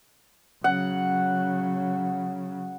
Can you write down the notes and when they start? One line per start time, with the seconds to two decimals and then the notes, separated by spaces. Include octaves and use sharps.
0.64 C#3 F#3 F#5